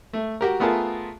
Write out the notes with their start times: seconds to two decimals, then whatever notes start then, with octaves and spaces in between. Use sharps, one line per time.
0.13 A3
0.41 F#4 G4 A#4
0.60 A3 B3 F4 G#4 A#4 A5